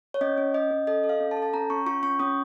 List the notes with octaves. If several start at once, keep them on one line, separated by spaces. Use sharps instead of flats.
C#5
C#4 D#5
C#4
C#4 D#5
C#4
A4 D#5
A4
F5
C#4
A5
A4
A5
C#4 A#5
C#4 C#6
F4 C#6
C#4 C#6
C#4 D#6